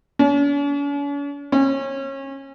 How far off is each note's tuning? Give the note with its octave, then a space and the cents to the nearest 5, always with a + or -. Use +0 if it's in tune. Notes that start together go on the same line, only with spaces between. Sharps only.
C#4 +45
C#4 -30